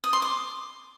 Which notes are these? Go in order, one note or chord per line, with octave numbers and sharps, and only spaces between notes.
D#6
C6
D6